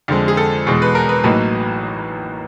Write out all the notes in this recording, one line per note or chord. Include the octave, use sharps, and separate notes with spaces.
F2 D3 F3 G#3
G#4
A4
E2 B2 G#3
B4
A#4
B4
A1 A2 F#3 A#3 D#4 B4